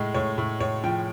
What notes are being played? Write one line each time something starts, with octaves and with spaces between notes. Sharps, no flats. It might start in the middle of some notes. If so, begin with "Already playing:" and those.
Already playing: A2 G#3
A2 C#5
A2
A2 C#5
F3 G5